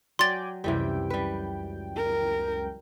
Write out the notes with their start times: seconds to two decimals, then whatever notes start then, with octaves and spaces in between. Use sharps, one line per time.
0.19 F#3 D5 G5 G#5 C6 A6
0.64 C#2 F#2 C3 E3 G3 G5
1.10 G3 B4
1.96 A#4